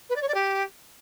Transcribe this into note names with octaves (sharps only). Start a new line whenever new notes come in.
B4
D5
C#5
D5
G4